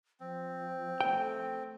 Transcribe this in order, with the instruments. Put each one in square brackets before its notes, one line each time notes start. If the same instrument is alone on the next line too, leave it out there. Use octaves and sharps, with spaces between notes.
[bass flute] F3 [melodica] C4
[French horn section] A3 [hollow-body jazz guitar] G5